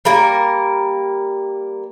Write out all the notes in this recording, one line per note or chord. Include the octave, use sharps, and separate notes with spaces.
G3 A#3 A#4